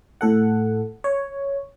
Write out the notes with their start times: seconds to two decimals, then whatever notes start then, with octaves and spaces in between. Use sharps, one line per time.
0.21 A2 A4 F#5
1.04 C#5